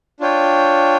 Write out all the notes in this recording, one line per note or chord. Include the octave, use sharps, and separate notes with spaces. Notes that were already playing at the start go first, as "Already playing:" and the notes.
D4 F4 C#5 G5